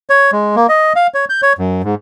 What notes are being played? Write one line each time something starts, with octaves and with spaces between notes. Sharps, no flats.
C#5
G#3
A#3
D#5
F5
C#5
G6
C#5
F#2
G#2